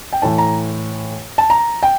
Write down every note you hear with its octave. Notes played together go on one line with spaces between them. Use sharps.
G5
A2 E3 A5
A#5
A5
A#5
G5